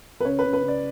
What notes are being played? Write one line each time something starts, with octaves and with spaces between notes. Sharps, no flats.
B4
C#3 C#5
B4
C#3
B4
C#3
D5